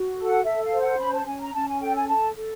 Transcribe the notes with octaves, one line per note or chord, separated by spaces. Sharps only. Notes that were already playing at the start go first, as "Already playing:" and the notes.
Already playing: F#4
A4
F#5
A4 E5
F5
C5
F#5
C#4 B5
A5
C#4 G#5
A#5
C#4 A5
G#5
A4 G5
G#5
A4 A5
A4